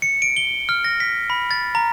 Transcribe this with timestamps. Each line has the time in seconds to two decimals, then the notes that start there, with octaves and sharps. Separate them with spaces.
0.02 C#7
0.22 D7
0.37 G7
0.69 F6
0.84 A#6
1.00 B6
1.30 B5
1.51 A6
1.75 A#5